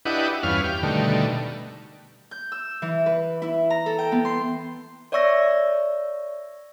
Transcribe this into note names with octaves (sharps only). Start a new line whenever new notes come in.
D4 E4 G4 B4 D#5 F#5
E2 G2 C#4 B4 F5 F6
G4
B2 D3 D#3 G3 A3
G6
E6
E3
B4
E4
A#5
A4
G5
B3
C6
C#5 D5 E5 C#6 E6 A#6